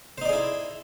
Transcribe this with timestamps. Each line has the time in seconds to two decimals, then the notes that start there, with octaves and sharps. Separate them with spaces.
0.18 C5
0.21 D#4
0.25 D5
0.29 G#4
0.33 E4